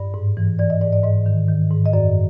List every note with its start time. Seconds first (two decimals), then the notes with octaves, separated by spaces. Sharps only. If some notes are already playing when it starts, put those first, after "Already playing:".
Already playing: G2 D5
0.14 G#2
0.37 E3
0.59 E3 D5
0.70 D#5
0.81 G#2 D5
0.92 D5
1.04 G#2 D#5
1.26 D#3
1.48 D#3
1.71 G#2
1.86 D#5
1.93 F#2 D5